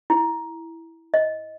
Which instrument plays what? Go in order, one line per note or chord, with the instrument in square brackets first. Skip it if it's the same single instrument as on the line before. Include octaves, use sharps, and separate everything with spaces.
[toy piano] E4
D#5